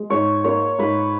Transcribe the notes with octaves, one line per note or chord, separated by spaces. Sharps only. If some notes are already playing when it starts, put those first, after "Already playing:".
Already playing: G#3
G#2 C#5
A#3 C#5
G#2 B4